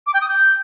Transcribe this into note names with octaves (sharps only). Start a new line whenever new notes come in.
D6
G5
D#6
G6